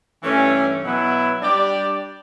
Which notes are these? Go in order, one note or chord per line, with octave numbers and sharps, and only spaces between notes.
G2 E3 A3 C#4
B2 F#3 B3 E4
G3 D4 G4 D5